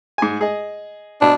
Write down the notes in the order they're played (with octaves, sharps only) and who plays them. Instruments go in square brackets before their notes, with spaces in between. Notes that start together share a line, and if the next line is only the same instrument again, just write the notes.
[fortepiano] G#2 G#5
G#4 D#5
[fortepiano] B2 [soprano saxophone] D4